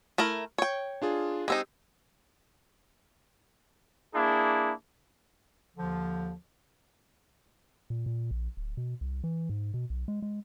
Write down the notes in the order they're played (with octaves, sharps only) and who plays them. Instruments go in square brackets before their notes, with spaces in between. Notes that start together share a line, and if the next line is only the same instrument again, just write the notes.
[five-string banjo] A3 E4 A#4
C#5 G5
[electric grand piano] D4 F4 G#4
[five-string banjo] G#3 C4 D#4 [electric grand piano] G4 D#6 E6
[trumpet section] A#3 D4 E4 G#4
[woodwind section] D#2 D3 F3
[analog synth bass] A#2
A#2
A#1
D1
B2
C2
E3
G#2
B2
B1
G#3
G#3